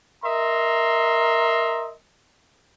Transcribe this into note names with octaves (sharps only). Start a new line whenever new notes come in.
A#4 D#5 E5 A#5 C6